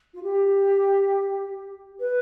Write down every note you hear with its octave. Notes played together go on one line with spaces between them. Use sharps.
F4
G4
B4